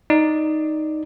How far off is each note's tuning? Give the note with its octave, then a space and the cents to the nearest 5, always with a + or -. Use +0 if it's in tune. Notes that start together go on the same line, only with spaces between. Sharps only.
D#4 +0 D5 +0